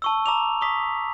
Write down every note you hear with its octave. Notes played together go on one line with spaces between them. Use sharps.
A5 C#6 E6
A#5 D6 F7
C#6 D#6 B6